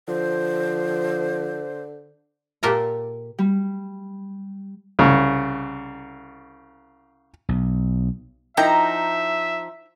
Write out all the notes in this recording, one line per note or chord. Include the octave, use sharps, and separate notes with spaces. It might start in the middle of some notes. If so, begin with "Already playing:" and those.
D3 F3 C5
A#2 G4 A4 A#4 C5 A#5
G3
C2 C#3
B1
F3 D#4 E4 A#4 E5 G5 A#5